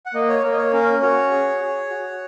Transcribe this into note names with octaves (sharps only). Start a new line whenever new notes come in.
F#5
A#3 D#5
C#5
A#3 A#4
D#5
C#5
C#4 A#4
F#4 C#5
G#4
G#4
F#4